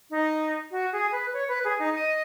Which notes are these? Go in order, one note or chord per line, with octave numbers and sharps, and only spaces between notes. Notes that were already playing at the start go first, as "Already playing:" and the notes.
D#4
F#4
G#4
B4
C#5
B4
G#4
D#4
D#5